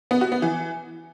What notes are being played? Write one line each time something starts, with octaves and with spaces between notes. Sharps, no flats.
B3
F#4
B3
E3